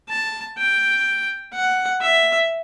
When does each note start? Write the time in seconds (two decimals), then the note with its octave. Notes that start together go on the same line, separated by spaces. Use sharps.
0.09 A5
0.58 G5
1.53 F#5
2.01 E5